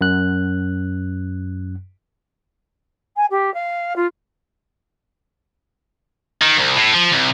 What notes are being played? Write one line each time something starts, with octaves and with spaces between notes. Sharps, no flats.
F#2 F#6
G#5
G4
F5
F4
D#3
C2
A2
F3
C2